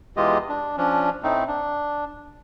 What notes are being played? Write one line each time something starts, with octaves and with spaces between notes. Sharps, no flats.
E2 E3 G#3 F4 G4 D#5
D4
F3 C#4 D4
A2 A3 C4 D#4
D4